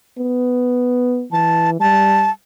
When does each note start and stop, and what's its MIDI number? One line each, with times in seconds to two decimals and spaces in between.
0.18 1.25 59
1.32 1.80 52
1.32 1.70 81
1.80 2.29 55
1.80 2.30 81